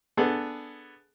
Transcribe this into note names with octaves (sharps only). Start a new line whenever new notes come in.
B3 D4 G#4 A4